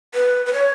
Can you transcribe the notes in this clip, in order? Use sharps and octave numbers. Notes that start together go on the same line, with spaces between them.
B4
B4
C#5